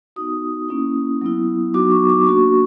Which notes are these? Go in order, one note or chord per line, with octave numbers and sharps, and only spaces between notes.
B3 D#4 F#4 D#6
A#3 C#4 E4
F#3 B3 E4
F#3 B3 D#4 F#4 D6
C#6
D6
A#3 D4 F#4 C#6